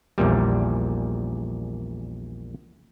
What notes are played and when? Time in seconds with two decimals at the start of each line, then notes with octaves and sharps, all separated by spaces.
0.18 A#1 E2 A#2 G3